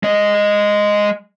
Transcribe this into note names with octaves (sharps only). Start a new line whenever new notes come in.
G#3 D#5